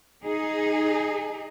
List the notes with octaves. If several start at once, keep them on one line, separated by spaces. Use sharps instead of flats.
D#4 G#4